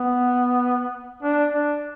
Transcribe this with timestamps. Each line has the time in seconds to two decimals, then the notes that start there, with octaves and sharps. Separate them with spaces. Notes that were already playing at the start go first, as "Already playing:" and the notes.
Already playing: B3
1.23 D4
1.54 D4